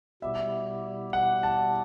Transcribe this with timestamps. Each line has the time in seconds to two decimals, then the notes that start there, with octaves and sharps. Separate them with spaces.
0.22 B2 G3 B3 E4 G4 E5
1.13 F#5
1.43 A5